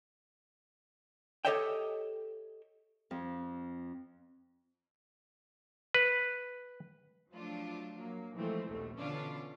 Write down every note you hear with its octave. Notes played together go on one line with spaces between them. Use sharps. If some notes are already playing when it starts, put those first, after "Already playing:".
G4 A4 C#5 D#5 E5 G5
F2
B4
F3 F#3 A3 D4 F4
F#3 A#3
E3 F3 G#3 A3 C4
A#1 D#2 B2 A3
B2 D3 E3 C#4 D4 F4